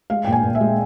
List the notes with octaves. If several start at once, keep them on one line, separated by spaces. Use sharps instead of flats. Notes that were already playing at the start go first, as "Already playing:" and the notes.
G#3 F5
A#2 G5
G#5
A#2
E5
G#3